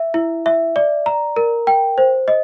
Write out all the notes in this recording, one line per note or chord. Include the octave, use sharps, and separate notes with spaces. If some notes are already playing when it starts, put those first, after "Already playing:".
Already playing: E5
E4
E5
D5
A#5
A#4
G5
C5
D#5